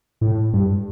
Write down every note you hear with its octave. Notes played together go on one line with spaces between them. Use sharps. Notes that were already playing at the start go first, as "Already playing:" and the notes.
A2
G2